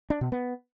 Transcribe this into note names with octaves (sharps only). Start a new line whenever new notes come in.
D4
B2
B3